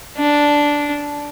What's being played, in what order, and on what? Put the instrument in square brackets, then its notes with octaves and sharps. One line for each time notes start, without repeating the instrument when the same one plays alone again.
[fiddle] D4